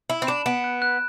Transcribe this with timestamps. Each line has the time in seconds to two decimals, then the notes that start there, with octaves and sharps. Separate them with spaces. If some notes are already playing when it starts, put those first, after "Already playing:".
0.09 E4 B5
0.22 C4
0.27 D4 E7
0.46 B3 D7
0.64 F#6
0.82 F#6